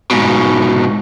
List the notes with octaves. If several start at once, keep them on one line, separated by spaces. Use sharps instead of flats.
G#2 B2